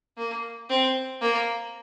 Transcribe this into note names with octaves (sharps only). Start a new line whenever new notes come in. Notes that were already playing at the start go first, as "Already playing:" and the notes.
A#3
C4
A#3